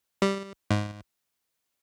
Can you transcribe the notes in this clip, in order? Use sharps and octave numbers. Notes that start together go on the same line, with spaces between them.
G3
G#2